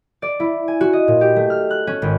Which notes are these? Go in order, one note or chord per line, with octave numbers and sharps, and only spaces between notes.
D5
E4
G#5
F#4
D#5
A#2
G4
A3
F6
F#6
C#4
G#1